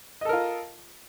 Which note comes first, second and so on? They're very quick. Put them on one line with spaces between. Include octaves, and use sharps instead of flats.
D#5 A4 A#4 F4